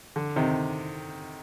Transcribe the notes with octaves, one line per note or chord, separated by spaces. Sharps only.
D3
C3 D#3